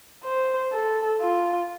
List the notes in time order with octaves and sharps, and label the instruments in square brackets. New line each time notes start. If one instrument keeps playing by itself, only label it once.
[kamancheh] C5
A4
F4